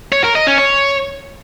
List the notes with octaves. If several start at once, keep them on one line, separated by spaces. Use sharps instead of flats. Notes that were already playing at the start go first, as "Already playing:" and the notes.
C#5
A#4
D#5
C#4
C#5